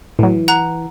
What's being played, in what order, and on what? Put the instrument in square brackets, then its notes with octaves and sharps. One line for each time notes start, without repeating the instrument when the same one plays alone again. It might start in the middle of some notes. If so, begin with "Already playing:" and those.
[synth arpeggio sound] A2 F#3 [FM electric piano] E3
[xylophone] F#5 A#5 F#6